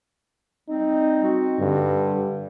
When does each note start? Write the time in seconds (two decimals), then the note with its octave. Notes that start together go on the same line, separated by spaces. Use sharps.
0.69 G3 C4 D#4
1.22 C4 F#4
1.60 G2 D3